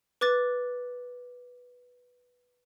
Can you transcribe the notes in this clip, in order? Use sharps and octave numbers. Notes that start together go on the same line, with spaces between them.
B4 D6 F#6 A6